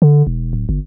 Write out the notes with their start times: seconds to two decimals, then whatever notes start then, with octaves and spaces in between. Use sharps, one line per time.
0.02 D3
0.27 E1
0.53 D1
0.69 G1